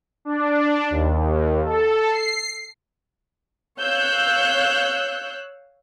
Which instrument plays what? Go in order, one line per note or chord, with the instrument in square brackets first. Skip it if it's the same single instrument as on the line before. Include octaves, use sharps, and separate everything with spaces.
[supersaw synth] D4
D#2
A4
C7
[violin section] C#5 F5 E6 F#6 G6